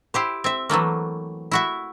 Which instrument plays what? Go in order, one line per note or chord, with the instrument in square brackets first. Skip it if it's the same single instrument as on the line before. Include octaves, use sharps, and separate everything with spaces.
[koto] E4 G4 C5
C4 E5
E3 F#3 A3 A#3
E4 F#4 E5